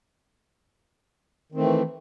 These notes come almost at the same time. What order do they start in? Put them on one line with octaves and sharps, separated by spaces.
D#3 C4 A3 E3